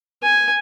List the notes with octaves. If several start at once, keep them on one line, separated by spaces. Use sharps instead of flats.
G#5